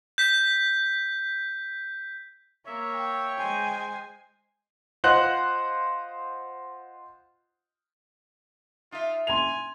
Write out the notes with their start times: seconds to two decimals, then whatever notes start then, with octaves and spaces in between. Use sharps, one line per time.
0.18 G6 B6
2.66 A#3 C#5 E5
2.95 G5
3.38 G#3 C5 G#5
5.04 F4 C5 D#5 F#5 F#6 F#7
8.92 D#4 F4 E5
9.27 G#5 C6 F7